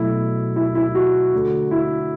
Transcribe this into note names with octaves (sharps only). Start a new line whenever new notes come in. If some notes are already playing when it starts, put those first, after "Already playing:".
Already playing: B2 F#3 A3 E4
E4
E4
F#4
D3 A3
E4